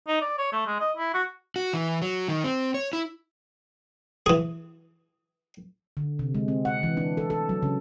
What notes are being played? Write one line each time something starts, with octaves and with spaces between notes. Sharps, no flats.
D#4
D5
C#5
A3
G#3
D#5
E4
F#4
F#4
E3
F#3
D#3
C4
C#5
E4
E3 G#4
D3
C3
G#3
C4
F#5
E3
D4
A4
A4
F#3
C#3